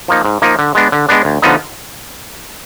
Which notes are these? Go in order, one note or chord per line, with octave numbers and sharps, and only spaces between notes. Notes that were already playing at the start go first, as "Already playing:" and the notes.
F3 A#3 D#4
G#2
F3 A#3 D#4
D3
G#3 B3 D4
D3
G#3 B3 D4
D2
D3 F3 B3 D#4